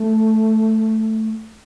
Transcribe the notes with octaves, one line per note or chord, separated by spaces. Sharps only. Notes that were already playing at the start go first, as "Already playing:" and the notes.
Already playing: A3